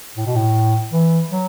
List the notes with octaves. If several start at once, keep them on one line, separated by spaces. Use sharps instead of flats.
A2
B2
A2
E3
F#3